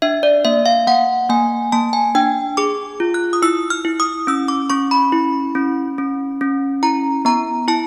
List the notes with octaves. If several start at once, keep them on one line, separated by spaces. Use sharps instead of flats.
D4 E5
D5
A#3 E5
F5
A#3 F#5
A#3 G#5
A#3 A5
G#5
D4 G5
G#4 D6
F4
F#6
D#6
E4 E6
F6
E4
D#6
C#4 E6
D6
C#4 C#6
B5
E4
C#4
C#4
C#4
E4 A#5
B3 A#5
E4 A5